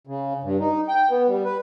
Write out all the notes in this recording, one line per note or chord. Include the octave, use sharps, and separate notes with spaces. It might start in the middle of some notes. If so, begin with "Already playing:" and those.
C#3
G2
D#4
G5
B3
G3
B4